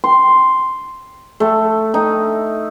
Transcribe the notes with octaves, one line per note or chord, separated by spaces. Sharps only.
C6
A3
D#4